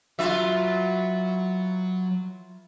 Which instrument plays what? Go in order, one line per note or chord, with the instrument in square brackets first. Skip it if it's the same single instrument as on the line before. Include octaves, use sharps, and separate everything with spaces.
[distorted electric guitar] F#3 [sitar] F4 B4 E5